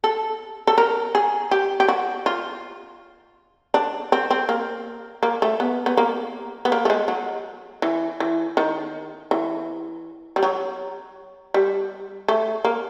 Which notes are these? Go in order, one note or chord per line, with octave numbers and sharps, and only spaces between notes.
A4
A4
A#4
G#4
G4
G4
F#4
F4
D4
C4
C4
A#3
A#3
A3
B3
B3
A#3
B3
A#3
A3
G#3
F#3
E3
E3
D#3
E3
G3
F#3
G3
A3
A#3